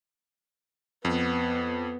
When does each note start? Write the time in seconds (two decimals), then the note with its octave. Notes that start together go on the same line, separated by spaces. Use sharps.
1.05 F2 B3